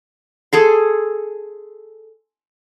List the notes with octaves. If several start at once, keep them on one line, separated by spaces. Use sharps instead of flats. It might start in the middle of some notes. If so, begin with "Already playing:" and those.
G#4 A4 C6